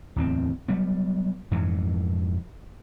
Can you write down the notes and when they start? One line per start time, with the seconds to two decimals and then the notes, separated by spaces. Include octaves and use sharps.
0.16 D1 E2 C4
0.68 F#3 G3 B3
1.51 F2 G#2 B2 E3